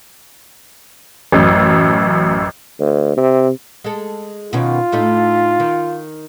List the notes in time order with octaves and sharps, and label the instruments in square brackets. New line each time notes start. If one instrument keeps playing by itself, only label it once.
[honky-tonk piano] A1 F#2
[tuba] D2
C3
[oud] G#3 A4
[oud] B2 D#3 C#4 [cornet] F4
[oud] A2 A3 D#4
D#3